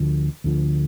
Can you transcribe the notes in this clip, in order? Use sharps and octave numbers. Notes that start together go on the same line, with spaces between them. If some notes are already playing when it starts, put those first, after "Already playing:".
Already playing: D2 D3 F3
D2 D3 F3